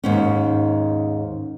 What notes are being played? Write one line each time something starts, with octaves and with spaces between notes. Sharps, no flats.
D#2 G#2 C#4